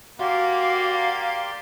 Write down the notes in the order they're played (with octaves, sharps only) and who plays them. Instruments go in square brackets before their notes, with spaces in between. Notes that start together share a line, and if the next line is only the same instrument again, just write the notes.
[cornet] A#3 [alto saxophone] F#4 [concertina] G4 D5 C6 [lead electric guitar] F5